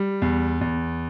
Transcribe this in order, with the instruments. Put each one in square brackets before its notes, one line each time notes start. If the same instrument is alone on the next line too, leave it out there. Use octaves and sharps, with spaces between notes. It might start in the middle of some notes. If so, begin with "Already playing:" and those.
Already playing: [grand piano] G3
E2
E2